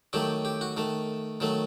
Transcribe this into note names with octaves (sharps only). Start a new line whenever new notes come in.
D#3 F#3 A3 G4
G4
F#4
D#3 A3
D#3 F#3 A3